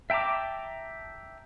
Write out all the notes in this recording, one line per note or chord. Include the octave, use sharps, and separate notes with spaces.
E5 G5 A5 A#5 D6